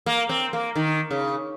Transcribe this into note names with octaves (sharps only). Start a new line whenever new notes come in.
A#3
C4
A#3
D#3
C#3